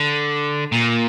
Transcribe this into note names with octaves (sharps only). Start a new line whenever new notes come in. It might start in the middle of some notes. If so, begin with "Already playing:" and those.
Already playing: D3
A#2